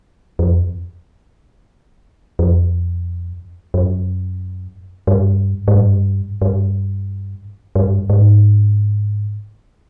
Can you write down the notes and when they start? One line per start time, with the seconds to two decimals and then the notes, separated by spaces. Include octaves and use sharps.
0.39 F2
2.39 F2
3.74 F#2
5.07 G2
5.68 G#2
5.75 G2
6.42 G2
7.75 G2
8.10 G#2